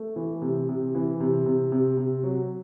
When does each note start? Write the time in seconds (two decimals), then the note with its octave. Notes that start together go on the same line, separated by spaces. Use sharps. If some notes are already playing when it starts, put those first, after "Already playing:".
Already playing: A3
0.16 E3
0.42 C3
0.69 C3
0.95 E3
1.20 C3
1.46 C3
1.72 C3
1.97 C3
2.23 F#3